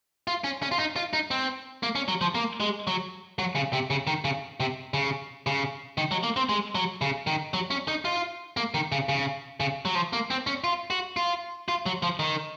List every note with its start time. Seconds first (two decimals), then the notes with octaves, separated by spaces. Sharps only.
0.27 F4
0.44 C#4
0.62 C#4
0.71 F4
0.79 D#4
0.96 F4
1.13 D#4
1.31 C4
1.83 A#3
1.95 C#4
2.08 F#3
2.21 F3
2.35 A#3
2.60 G#3
2.87 F#3
3.39 F#3
3.56 C#3
3.73 C3
3.90 C#3
4.07 D#3
4.24 C#3
4.60 C3
4.94 C#3
5.47 C#3
5.98 D#3
6.11 F#3
6.23 A#3
6.36 C4
6.49 G#3
6.75 F#3
7.01 C#3
7.27 D#3
7.54 F#3
7.71 C#4
7.88 D#4
8.05 F4
8.57 A#3
8.74 D#3
8.92 C#3
9.09 C#3
9.60 C#3
9.85 F#3
9.95 F3
10.13 A#3
10.30 C4
10.47 C#4
10.64 F4
10.90 F#4
11.17 F4
11.68 F4
11.86 F#3
12.03 F3
12.19 D#3